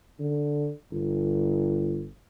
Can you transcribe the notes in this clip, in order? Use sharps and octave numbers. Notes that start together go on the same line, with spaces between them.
D3
G1